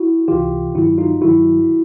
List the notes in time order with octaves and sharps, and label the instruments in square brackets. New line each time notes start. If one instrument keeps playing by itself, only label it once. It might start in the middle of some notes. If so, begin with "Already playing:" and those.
Already playing: [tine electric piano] E4 F#4
C#2 C3 E3 F4 G4
G2 D#3 F#3 E4 F#4
D#4 F4
G2 D#3 F#3 E4 F#4